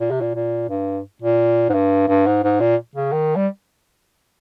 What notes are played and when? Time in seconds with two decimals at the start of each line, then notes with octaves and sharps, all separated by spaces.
0.01 A#2
0.11 C3
0.21 A#2
0.35 A#2
0.69 G2
1.22 A#2
1.69 G#2
1.74 G2
2.08 G2
2.27 G#2
2.44 G#2
2.60 A#2
2.96 C#3
3.12 D#3
3.36 G3